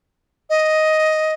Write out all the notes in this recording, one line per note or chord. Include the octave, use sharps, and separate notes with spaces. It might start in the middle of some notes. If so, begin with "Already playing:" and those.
D#5